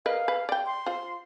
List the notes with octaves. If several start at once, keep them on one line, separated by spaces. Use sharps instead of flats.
A#4 B4 D#5 F5
B4
D5 G5
C6
F4 C5